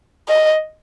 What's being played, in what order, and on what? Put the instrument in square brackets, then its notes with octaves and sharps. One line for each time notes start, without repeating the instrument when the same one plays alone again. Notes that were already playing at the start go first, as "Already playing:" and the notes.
[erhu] D#5